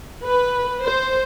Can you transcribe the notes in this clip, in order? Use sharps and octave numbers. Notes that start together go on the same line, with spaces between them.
B4
C5